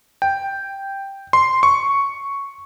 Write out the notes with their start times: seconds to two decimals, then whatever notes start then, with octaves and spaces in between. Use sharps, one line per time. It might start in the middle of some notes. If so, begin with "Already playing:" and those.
0.22 G5
1.33 C6
1.63 C#6